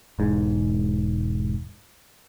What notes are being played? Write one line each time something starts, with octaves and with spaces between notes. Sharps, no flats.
E1 G#2